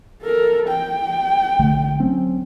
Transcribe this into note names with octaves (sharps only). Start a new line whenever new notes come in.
A4 A#4
G5
A#1 D3 A3
F#3 C4 C#4